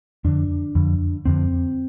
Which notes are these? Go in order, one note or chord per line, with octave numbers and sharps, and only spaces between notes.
F2 D3 D4
F2 D3
F2 D3 C4